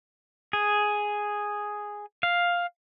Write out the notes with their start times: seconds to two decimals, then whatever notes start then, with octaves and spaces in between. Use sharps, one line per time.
0.53 G#4
2.23 F5